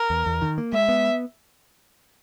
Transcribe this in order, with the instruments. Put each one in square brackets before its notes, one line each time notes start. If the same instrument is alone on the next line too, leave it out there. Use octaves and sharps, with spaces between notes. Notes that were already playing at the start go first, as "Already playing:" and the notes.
Already playing: [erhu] A#4
[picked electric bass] E2
E2
D#3
A#3
[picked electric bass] G#3 [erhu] E5
[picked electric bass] B3